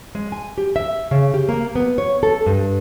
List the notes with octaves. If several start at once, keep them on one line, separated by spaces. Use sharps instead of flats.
G#3
G#5
G4
E5
C#3
G4
A#3
B3
C#5
A4
G2